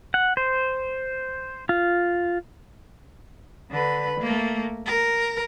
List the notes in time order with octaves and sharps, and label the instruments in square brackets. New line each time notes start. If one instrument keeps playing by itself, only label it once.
[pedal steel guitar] F#5
C5
F4
[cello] D3 B4
A3 A#3
A#4